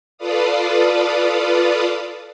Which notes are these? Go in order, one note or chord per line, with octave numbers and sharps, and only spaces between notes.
F4 A4 B4 D5 F5 D#6